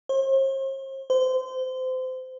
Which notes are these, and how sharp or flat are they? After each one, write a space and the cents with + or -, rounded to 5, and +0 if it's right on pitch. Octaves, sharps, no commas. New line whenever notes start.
C5 +45
C5 -25